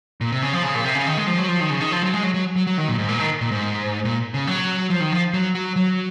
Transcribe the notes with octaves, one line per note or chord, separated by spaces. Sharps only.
A#2
C3
C#3
F3
C#3
A#2
C3
C#3
D#3
G#3
F3
F#3
F3
D#3
C#3
D#3
F3
F#3
G#3
F#3
F#3
F#3
F#3
D#3
A#2
G#2
A#2
D#3
A#2
G#2
A#2
C#3
F#3
F3
D#3
F3
F#3
F#3
F#3